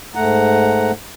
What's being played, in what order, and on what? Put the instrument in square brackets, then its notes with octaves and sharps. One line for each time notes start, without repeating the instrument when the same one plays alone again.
[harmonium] G#2 A3 F#5 A#5